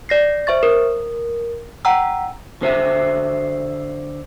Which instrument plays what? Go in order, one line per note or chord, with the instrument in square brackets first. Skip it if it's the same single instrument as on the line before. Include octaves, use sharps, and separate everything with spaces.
[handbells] D5 A#6 C7
C5 E5 C#6 A6
A#4
F#5 G5 A#5 E6
[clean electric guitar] D3 C5 E5